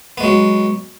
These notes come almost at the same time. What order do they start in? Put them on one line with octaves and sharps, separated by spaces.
B3 G#3 F#3